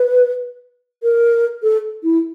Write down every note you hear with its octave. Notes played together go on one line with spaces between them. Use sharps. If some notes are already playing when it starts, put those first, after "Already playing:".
Already playing: B4
A#4
A4
E4